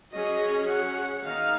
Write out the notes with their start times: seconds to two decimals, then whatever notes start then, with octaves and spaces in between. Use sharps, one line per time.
0.12 F#3 C#4 G#4 C#5 D#5
0.68 F#5
1.24 D#3 A#3 D#4 F5